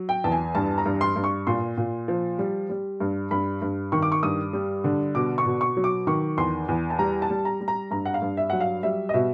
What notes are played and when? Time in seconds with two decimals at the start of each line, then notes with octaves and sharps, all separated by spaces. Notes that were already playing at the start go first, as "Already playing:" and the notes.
Already playing: F#3
0.09 G5
0.24 E2 A5
0.32 G#5
0.55 G2 A5
0.78 A#5
0.86 G2
1.01 C6
1.16 G2
1.24 C#6
1.47 A#2 C6
1.77 A#2
2.08 F3
2.39 G3
2.70 G3
3.00 G2
3.31 G2 B5
3.62 G2
3.92 D#3 C#6
4.02 D6
4.12 C#6
4.23 G2 D#6
4.53 G3
4.84 D3
5.15 B2 D6
5.38 C#6
5.46 B2
5.61 C#6
5.77 F#3
5.84 D6
6.07 D#3 C#6
6.37 E2 C6
6.68 E2
6.90 A5
6.99 G3 A#5
7.22 A5
7.30 G3
7.45 A#5
7.61 G3
7.68 A#5
7.91 G2 A#5
8.05 F#5
8.14 F5
8.22 G2
8.37 E5
8.50 F#3 F#5
8.61 F5
8.83 G3 E5
9.09 D#5
9.14 B2 E5